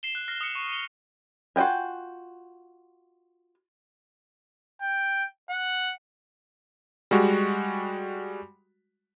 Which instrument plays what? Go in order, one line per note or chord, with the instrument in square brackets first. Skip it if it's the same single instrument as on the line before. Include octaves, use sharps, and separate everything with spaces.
[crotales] C7 E7 G7
F#6
F6 A#6 C7
D#6 C#7
C#6
D#7 F7 G7
[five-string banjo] F4 F#4 D#5 G5 G#5
[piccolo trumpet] G5
F#5
[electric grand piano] G3 G#3 F#4